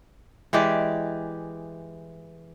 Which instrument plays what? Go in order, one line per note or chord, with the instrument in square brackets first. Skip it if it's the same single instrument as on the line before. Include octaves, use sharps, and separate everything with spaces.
[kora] E3 G#3 G4 D5